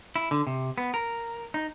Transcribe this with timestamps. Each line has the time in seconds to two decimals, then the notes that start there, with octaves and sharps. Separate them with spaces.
0.16 E4
0.31 D3
0.47 C3
0.78 B3
0.94 A#4
1.54 D#4